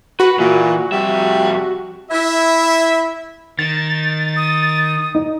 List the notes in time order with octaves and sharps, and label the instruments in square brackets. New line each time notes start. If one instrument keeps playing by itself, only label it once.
[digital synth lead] F#4 [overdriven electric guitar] B4
[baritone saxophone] A#2 [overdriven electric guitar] E3
[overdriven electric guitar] F2 E5 [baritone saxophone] G3
[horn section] E4 E5
[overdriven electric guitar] D#3 [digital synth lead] A6
[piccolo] D#6
[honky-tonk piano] D#4